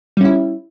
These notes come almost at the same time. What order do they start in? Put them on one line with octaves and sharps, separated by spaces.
G3 C#4 E4